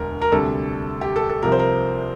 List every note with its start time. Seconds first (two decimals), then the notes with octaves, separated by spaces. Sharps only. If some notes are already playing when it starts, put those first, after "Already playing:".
Already playing: E1 D2 D3 A#4
0.21 A#4
0.32 D2 C3 G3 A4
1.01 G4
1.16 A4
1.29 A4
1.42 C2 C3 F3 A#4
1.52 C5
1.59 A#4